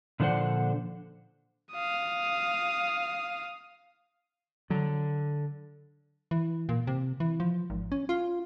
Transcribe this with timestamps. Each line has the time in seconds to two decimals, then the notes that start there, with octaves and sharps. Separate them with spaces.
0.20 A#2 D3 F3 D4 C5 F#5
1.73 F5 D#6
4.70 D3 F#3
6.31 E3
6.69 A#2
6.87 C3
7.20 E3
7.40 F3
7.70 G#1
7.92 C#4
8.09 F4